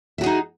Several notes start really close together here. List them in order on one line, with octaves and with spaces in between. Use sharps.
E5 F#4 G#4 D#4